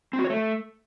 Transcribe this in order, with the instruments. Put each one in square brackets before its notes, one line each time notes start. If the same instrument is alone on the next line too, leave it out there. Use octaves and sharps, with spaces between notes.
[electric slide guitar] C4
F#4
C#5
A3